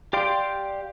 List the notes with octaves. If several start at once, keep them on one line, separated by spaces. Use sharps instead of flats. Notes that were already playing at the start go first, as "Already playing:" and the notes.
G4 D5 F5 G5 C6